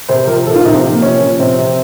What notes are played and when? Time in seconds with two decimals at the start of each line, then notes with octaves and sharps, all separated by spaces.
0.09 C3 C5
0.27 F3 A#4
0.46 F3 A4
0.56 F4
0.65 C3 D#4
0.74 C4
0.84 C3
0.93 A#3
1.02 F3 C#4
1.21 F3
1.39 C3 C4
1.58 C3